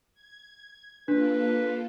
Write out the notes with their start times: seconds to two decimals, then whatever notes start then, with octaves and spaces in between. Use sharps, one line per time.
0.14 G#6
1.08 A#3 D4 F4 A4 B4